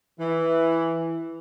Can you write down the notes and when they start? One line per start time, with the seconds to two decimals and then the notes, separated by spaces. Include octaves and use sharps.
0.18 E3